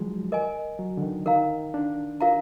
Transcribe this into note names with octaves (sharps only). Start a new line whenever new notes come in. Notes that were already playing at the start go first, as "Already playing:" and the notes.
Already playing: D#3 F3 F#3 G#3
A#4 D#5 G#5
F#3
D3
D#3
D#3 A#4 F5 A#5
D4
F4 A#4 F5 A#5